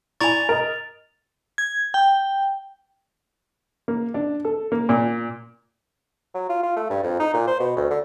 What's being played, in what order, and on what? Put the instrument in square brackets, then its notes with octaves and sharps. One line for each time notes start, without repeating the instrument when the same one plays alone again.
[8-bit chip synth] E4 A#5 C#6 [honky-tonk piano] D5 G#5 [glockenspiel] A6 F7
[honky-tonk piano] A#4 D#5
[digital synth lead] G#6
G5
[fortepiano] A#3
D4
A4
A#3
A#2
[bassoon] F#3
F4
F4
A3
G2
F2
D#4
A#2
C5
B2
D2
D3